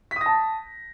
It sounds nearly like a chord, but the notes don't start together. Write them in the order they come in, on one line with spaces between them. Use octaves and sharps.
B6 D#6 A#6 A5